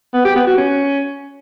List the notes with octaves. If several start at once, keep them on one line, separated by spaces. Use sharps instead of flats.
B3
G4
B3
F#4
C#4